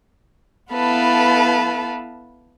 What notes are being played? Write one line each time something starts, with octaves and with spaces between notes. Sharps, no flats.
B3 E4 A4 B4 F5 A5